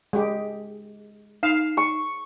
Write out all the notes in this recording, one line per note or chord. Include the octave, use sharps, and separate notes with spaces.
G#3 G4
D#4 F5 C7 E7
C#6